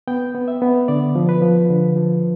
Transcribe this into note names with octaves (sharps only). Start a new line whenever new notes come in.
B3 G5
B3
E5
B3
D3 D5
F3
B4
F3
D3
F3